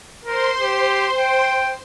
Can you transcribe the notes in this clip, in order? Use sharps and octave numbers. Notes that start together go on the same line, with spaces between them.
A#4 C5 C6
G4
G5